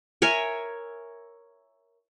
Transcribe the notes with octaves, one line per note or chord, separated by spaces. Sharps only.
A#4 C#5 E5 G#5